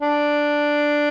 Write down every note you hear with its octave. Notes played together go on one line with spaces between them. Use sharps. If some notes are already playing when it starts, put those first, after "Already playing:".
D4